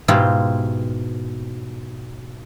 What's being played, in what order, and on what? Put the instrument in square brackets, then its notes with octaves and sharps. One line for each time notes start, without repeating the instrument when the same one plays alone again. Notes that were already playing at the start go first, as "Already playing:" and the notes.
[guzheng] G#2 B2 E4 F4 G4